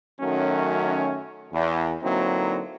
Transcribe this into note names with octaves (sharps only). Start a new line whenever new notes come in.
F#2 D#3 F#3 A3 C#4
E2
D3 F#3 A#3 C4 D#4 E4